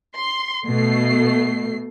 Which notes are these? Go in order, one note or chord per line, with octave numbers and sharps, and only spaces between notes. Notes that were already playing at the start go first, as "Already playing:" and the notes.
C6
B2 A3 C7